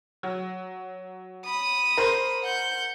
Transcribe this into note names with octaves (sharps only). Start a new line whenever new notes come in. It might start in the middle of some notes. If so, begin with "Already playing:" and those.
F#3
B5 D#6
A#4 C5
F#5 G6